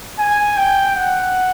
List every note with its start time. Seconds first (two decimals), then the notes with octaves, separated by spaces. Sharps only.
0.18 G#5
0.57 G5
0.96 F#5